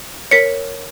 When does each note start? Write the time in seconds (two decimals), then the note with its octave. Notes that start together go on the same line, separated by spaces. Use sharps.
0.31 A#4 C#5 B6 C#7